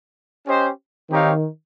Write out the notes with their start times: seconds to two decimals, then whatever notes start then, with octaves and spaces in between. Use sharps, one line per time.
0.46 C#4 G4 C5 D#5
1.09 D#3 C4 D#4 G4 C#5 F5